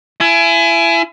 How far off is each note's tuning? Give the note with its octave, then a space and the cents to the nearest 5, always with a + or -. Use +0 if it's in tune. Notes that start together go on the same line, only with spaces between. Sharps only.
E4 +30 G#5 +20